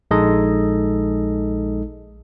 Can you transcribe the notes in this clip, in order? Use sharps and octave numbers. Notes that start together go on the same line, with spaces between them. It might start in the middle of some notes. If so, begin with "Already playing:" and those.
A#1 G#3 D#4 A4 D#5